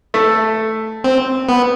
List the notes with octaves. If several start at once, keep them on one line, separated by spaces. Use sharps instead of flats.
A3
C4
B3